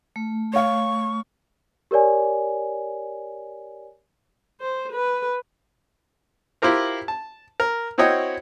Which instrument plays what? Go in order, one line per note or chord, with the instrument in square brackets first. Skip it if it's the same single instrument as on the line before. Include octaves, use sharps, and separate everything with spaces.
[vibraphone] A3
[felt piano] C#5 F5 [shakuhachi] C#6
[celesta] G4 A#4 C#5 D5 G#5
[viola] C5
B4
[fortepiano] E4 F4 G4 A#4 C5
A5
A#4
C4 E4 F#4 C#5 D#5 G5